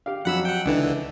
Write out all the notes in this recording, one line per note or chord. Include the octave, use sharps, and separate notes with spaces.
G4 F5
F2 F#3 F#5 B5 E6
F#5 G5
C#2 D3 E3 D4 D#4 B4